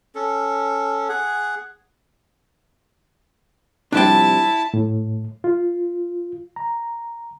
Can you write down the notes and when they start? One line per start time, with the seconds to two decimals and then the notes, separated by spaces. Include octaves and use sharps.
0.15 C#4 A4
1.09 G#4 F#5
3.92 C3 F3 G3 D4 E4 G5 A5
4.74 A2
5.44 F4
6.56 A#5